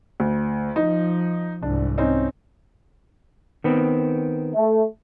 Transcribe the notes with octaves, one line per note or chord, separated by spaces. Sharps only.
D2
F3 D#4
C2 G#2 D4
C4 C#4 D#4
D#3 B3 C4
A3